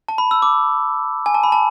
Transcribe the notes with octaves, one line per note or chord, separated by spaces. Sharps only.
A5
B5
E6
D6
G#5
A5
B5
A5